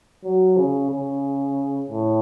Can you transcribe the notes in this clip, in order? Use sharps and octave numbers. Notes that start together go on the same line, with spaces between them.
F#3
C#3
C#3
A2